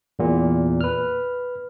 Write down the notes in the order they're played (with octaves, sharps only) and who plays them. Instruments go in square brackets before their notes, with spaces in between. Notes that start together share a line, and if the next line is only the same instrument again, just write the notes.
[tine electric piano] E2 A#2
B4 F6